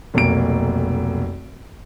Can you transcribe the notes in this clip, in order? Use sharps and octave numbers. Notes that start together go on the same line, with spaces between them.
F1 B1 A#3 D7